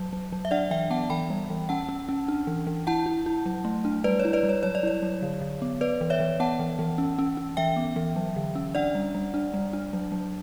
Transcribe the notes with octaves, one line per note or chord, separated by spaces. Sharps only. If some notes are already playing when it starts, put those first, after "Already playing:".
Already playing: F#3
F#3
F#3
E5
D4 D5 F#5
E3 E5 G5
B3 F#5 A5
E3 G5 B5
G3
E3
C#4 F#5 A5
C#4
C#4
D4
E3
E3
E4 F#5 A5
E4
E4
F#3
A3
D4
G3 B4 D5
C#5
E4
B4 D5
G3
C#5
F#3 C#5
D5
E4 C#5
F#3
D3
D3
B3
B3 B4 D5
E3
C#5 E5
E3
B3 F#5 A5
E3
E3
C#4
C#4
C#4
E3 E5 G5
B3
E3
F#3
D3
C#4
D4 D5 F#5
G3
G3
D4
G3
D4
F#3
F#3